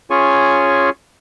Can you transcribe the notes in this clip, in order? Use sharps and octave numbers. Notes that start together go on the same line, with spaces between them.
C#4 F4 G#4 C#5 G#5 C#6